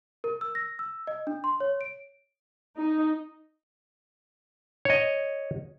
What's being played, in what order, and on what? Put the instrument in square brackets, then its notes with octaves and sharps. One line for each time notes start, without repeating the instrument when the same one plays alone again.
[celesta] A#4
E6
A#6
E6
D#5
D4
C6
C#5
D7
[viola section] D#4
[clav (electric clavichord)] C#5 D#5